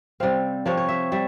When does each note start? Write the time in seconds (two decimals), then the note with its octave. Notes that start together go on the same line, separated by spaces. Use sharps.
0.20 C3 G3 C4 F5
0.66 C3 F3 C4 C#5
0.77 C#5
0.88 E5
1.12 G3 E5